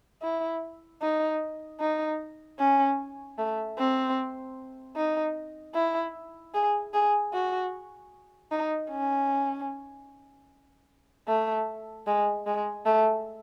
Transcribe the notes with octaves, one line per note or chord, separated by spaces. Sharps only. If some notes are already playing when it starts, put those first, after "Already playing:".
E4
D#4
D#4
C#4
A3
C4
D#4
E4
G#4
G#4
F#4
D#4
C#4
A3
G#3
G#3
A3